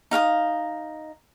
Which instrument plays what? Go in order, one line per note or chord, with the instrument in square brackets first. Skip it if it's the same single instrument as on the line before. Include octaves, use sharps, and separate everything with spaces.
[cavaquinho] D#4 F5 F#5 D#6